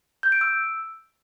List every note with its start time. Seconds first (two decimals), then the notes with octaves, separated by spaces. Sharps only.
0.23 G6
0.32 D7
0.41 E6